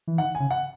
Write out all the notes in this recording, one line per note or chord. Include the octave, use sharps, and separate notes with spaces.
E3
D#3 F#5
G#5
C#3
F#5